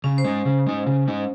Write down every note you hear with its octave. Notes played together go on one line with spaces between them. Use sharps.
C#3 C#4
C5
G#3 D#4
C#3
G#3 D#4
C#3
G#3 D#4